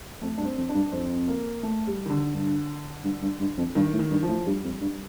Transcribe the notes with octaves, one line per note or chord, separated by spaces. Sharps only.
F2 A3
G2 D4
C4
F2
D4
G2
F2 C4
A#3
A3
G3
D#3
D3
G2
G2
G2
G2
F2
G2 D#3
A2
D#3
G2
F3
A2
G2 G3
F2
G2